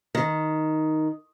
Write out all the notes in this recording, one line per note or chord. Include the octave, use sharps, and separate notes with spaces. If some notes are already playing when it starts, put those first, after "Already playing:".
D#3